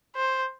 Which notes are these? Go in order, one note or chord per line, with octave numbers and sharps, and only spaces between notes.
C5